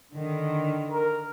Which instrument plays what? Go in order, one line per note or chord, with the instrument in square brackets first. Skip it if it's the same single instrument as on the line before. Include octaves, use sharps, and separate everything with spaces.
[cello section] D3 D#3
[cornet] A#4